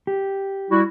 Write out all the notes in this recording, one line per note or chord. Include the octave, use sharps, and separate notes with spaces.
G4
G3 E4 F#4